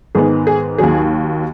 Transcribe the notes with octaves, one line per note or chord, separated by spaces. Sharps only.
G#2 D#3 G#3 B3 G#4
G#4
D#2 D#3 F#3 G#4